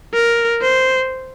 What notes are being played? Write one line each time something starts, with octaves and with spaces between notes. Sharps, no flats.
A#4
C5